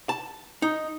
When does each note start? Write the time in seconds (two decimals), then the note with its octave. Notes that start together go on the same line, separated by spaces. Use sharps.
0.09 A5
0.62 D#4